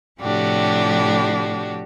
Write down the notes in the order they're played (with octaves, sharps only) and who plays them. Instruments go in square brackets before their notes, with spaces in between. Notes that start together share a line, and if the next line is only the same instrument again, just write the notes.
[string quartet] A2 C3 F3 D4 F#4 G4